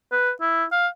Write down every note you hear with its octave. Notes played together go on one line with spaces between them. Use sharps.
B4
E4
F5